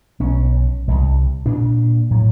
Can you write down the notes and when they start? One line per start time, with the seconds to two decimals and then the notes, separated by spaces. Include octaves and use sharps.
0.20 B1 C#4
0.88 E1 C2
1.46 A#2 D4
2.10 A2 F#3